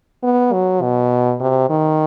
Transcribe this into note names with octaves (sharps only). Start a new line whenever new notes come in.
B3
F#3
B2
C3
D#3